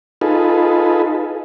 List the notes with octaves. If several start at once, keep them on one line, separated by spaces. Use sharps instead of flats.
D#4 F4 G#4 A4 B4